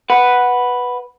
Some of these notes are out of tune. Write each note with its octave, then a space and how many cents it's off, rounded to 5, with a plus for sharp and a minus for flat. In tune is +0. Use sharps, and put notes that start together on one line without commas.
B4 +0 F#5 +0